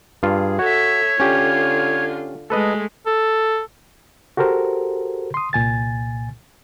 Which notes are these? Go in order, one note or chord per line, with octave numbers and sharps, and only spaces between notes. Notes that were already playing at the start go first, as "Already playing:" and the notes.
G2 F4 G#4
F#4 A4 C#5 E5
D3 C#4 F4 G4
G#3 A3 A4 B4 D#5
A4
F#4 G4 A4 A#4 C5
C6 D#6
C2 A#2 G#5 A6